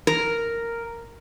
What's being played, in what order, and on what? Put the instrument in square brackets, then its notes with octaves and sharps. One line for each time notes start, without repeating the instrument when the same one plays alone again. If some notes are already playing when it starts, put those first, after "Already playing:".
[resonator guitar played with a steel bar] A#4